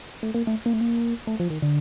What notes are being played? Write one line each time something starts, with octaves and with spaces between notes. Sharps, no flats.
A3
A#3
A3
A#3
A3
A#3
A3
F3
D#3
D3